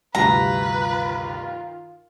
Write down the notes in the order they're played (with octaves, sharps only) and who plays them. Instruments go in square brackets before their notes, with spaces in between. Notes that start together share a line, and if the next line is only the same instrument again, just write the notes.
[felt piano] D2 G2 C3 [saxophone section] D#3 F4 [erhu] B4 [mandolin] A#5